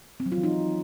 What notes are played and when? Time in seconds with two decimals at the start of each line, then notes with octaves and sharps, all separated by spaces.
0.20 C4
0.26 F#3
0.32 F4
0.38 E3
0.43 D#4